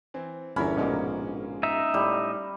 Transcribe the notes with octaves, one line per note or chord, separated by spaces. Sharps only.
E3 C4
G1 E2 C#4 D4 E4 A#4 B5
A#1 G#2 B2 D3 G#3 A#3
D#4 E5
A2 G3